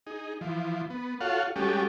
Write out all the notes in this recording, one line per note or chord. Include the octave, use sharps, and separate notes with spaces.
D#4 G#4
E3 F3
B3
F4 F#4 A4 C#5 F5 F#5
G3 G#3 C#4 F#4 G4 A4